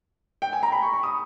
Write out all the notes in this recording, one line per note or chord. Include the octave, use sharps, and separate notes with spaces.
G5
G#5
A#5
B5
C#6
C#6
D#6